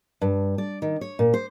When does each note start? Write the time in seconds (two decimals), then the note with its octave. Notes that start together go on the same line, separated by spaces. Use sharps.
0.21 G2
0.58 D5
0.82 D#3
1.01 C#5
1.19 A#2
1.34 C5